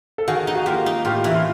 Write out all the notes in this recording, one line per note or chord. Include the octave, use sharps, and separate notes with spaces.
A4
D#3 F#4 G#4
D#4
F#4
A#3 F4 G4
D#4
A2 F4 G4
E3 E4
F4